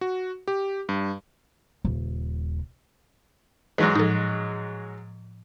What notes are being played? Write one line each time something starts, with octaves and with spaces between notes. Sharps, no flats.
F#4
G4
G2
D#1 C#3
G#2 E3 F#3 G#3 D#4 B4
A2 F3 D#4 A4